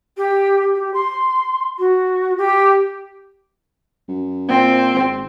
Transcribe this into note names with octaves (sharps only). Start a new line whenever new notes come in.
G4
G4
C6
F#4
G4
F#2
A#2 C4
G#1